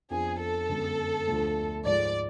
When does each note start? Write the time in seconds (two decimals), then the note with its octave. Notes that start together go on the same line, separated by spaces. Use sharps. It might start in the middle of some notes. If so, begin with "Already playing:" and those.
0.10 F2 F3 B3 D4 G#4
0.40 A4
0.69 F#2 D3 G#3 B3
1.28 D2 D3 F3 A3 D4
1.85 G#2 F3 G#3 D5